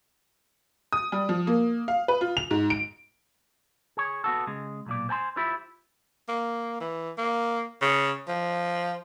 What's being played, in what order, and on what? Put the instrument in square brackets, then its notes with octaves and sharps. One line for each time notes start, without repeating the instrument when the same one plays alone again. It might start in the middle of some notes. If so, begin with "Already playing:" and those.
[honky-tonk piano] D#6
G3
F3
A#3
F5
B4
F4
F7
G#2
D7
[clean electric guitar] G#4 C#5
B3 F#4 A4
C#3 G#3
B1 A#2 D5
C5 G#5 A5 C6
E4 F4 G4 C5
[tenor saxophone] A#3
E3
A#3
C#3
F3